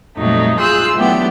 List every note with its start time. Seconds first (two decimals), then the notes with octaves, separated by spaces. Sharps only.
0.18 F2 A#2 F#3 G3 A3 D#4
0.59 F4 G#4 C6 E6 F#6 G6
0.96 E3 F#3 A3 B3 D4 G4